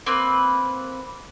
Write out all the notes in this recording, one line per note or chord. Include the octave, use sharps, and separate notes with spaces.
A#3 C4 B4